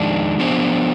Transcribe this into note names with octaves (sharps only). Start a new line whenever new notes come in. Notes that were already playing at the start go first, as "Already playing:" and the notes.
Already playing: F2 D#3 G#3 D4
F3 B3 D4 G#4 C5